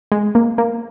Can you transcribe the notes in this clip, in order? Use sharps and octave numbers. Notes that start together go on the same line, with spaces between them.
G#3
A#3
A#3